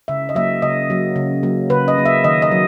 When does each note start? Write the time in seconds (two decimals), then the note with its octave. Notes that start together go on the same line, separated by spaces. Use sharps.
0.08 C#3 E5
0.29 D#5
0.35 F#3 A#3 E5
0.62 C#3 D#5
0.90 F#3 A#3
1.16 C#3
1.43 F#3 A#3
1.70 C#3 B4
1.88 D#5
1.98 F#3 A#3
2.05 E5
2.24 D#3 D#5
2.42 D#5
2.51 F#3